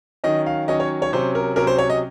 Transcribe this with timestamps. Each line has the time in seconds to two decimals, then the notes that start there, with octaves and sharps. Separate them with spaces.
0.24 D#3 F#3 C#4 D#5
0.46 F5
0.68 D#3 F#3 C#4 D#5
0.80 C#5
1.02 C#5
1.13 C3 F#3 C#4 C5
1.35 A#4
1.56 C3 F#3 C#4 A#4
1.67 C5
1.79 C#5
1.90 D#5